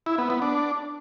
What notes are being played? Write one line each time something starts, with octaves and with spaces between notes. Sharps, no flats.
E4
B3
B3
D4